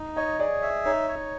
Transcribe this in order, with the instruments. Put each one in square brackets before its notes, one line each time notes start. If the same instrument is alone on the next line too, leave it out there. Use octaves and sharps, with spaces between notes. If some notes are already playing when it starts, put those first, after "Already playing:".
Already playing: [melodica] D#4
[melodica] C#5 [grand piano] D#5
[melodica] G#4 [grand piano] D5
[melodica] E5
[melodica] D#4 [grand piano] C#5
[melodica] C#5